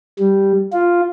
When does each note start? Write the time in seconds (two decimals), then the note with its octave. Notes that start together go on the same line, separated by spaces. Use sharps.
0.19 G3
0.73 F4